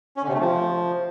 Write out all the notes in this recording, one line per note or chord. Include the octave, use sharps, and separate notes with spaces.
C#4
D3
C3
A3
F3